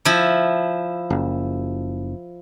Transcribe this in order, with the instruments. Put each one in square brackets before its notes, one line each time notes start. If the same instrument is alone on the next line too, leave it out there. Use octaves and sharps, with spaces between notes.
[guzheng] F3 E4
[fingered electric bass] F#1